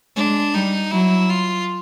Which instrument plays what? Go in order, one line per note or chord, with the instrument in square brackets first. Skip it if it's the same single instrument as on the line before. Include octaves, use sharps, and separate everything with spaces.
[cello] G#3 [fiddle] D4
[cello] G3 [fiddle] D#4
[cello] F#3 [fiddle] E4
[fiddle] F4